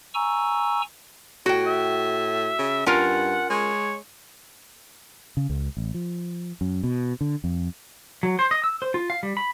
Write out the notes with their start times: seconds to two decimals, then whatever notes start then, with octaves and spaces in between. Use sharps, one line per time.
0.14 G#5 A#5 C#6 E6
1.46 A2 F#4 G5
1.67 E5
2.59 C#3
2.86 G2 C#4 F4 A#4 F#5
3.50 G#3 C#5
5.37 C#3
5.50 C#2
5.77 A1
5.94 F3
6.61 F#2
6.83 B2
7.21 D3
7.44 F2
8.23 F#3
8.39 C5
8.51 D#5
8.64 E6
8.82 C5
8.94 F4
9.10 F5
9.23 G3
9.37 B5